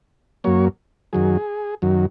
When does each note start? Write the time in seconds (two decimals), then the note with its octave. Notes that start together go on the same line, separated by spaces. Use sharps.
0.44 F#2 F#3 A#3 C#5
1.13 F#2 D#3 F#3 G#4
1.82 F#2 D#3 F#3